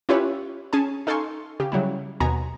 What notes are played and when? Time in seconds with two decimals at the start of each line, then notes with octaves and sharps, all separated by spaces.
0.09 C#4 E4 F4 G4 B4 C#5
0.73 C#4 G#4 G#5 A5
1.07 D#4 A4 F5 G#5 C6 C#6
1.60 C#3 G4
1.72 C#3 F#3 G3 E4
2.20 D#2 B2 B3 G#5 A#5